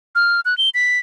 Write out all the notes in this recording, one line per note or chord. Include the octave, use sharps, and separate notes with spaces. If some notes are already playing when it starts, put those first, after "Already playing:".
F6
F#6
G7
B6